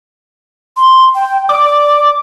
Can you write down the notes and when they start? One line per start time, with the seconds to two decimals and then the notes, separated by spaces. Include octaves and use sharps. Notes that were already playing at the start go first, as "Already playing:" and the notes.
0.77 C6
1.15 G5
1.49 D5 D6